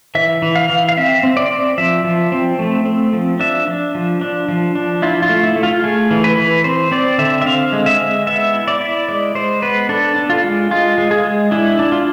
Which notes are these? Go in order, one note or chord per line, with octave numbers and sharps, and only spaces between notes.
E3 E5
E3
F5
E3
F5
C4 E5
C4
D5
C4
F3 E5
F3
C4
A3
C4
F3
D4 E5
D4
F3
D4
F3
D4
E4 F4
F4
A3
E4
A3
F4
A3 G#4
E3
B4
E3
C4 C5
C4 D5
D3 E5
E5
C4 F5
G#3
E5
G#3
B3 E5
E4
D5
E4
G#3 D5
G#3 C5
B3 B4
D4 A4
D4
F4
G#3
G#3 F4
G#3
G#4
G#3
D4 E4
D4
F4